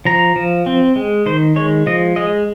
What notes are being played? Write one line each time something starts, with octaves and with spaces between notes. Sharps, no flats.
F3 A#5
F3
C4
G#3
D#3 C5
G#3 C#5
F3 D#5
G#3 D#5